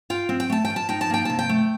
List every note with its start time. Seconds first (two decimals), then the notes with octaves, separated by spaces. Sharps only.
0.10 F4 G5
0.29 C4
0.40 G5
0.50 A3 A5
0.65 G5
0.70 F3
0.76 A5
0.89 D#4 G5
1.01 A5
1.10 A#3 G5
1.25 C3 A5
1.39 G5
1.49 A3